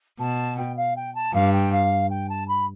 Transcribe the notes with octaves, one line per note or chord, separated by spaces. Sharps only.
B2 A5
G5
F5
G5
A5
G2 F5
G5
F5
G5
A5
B5